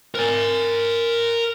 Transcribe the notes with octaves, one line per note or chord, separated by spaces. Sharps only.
A#4 G#5